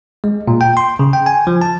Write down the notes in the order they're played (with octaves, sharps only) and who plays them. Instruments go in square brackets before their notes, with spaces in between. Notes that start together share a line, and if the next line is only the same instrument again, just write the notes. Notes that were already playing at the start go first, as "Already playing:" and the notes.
[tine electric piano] G#3
A#2
G5
C6
C#3
G5
G#5
F3
A5